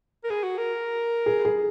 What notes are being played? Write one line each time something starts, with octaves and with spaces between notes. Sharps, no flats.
A#4
G#4
F#4
A#4
G#4
G#4